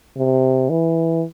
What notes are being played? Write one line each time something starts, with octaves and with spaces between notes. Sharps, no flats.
C3
E3